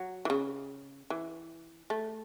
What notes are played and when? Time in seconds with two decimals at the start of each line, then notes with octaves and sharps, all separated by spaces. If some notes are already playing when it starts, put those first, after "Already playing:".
Already playing: F#3
0.25 E3
0.30 C#3
1.10 E3
1.90 A3